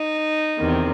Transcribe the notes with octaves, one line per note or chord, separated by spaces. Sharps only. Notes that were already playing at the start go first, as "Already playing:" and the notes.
Already playing: D#4
E2 C3 D#3